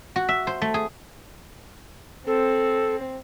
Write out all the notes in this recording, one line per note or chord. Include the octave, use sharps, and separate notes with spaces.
F#4
E5
C5
A3
G#4
C4 A4